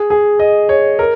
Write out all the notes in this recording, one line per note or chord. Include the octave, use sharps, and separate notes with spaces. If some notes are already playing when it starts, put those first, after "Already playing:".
Already playing: G#4
G#4
D#5
C#5
A#4